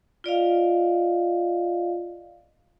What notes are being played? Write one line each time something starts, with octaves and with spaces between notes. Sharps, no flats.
F4 D5 D#5 F5